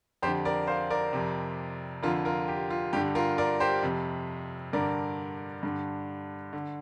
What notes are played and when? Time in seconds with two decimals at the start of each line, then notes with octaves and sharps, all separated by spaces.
0.22 F2 G4 C5
0.27 D3
0.45 A#4 D5
0.67 C5 F5
0.90 A#4 D5
1.13 F2 C3
2.03 F2 D3 F4 A#4
2.25 F4 A#4
2.48 G4
2.70 F4
2.93 G2 D3 G4
3.15 F4 A#4
3.38 A#4 D5
3.60 G4 C5
3.83 F2 C3
4.73 G2 D3 A#4 D5
5.63 G2 D3
6.53 D3